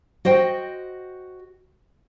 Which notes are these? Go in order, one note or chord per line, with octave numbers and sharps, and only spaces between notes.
F#4 C5 D#5 G5